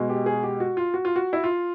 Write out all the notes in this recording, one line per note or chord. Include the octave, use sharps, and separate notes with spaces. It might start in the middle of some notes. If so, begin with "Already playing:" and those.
Already playing: B2 G#3
G4
G#4
G4
F#4
F4
F#4
F4
F#4
E4
F4